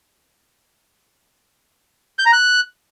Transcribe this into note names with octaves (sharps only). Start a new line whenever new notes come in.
G6
A#5
F#6